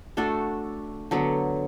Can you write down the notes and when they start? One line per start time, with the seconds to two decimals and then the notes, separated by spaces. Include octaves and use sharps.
0.17 A3 D4 F#4 A4
1.11 D3 F#3 B3